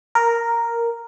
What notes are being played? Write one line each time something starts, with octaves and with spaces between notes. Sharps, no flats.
A#4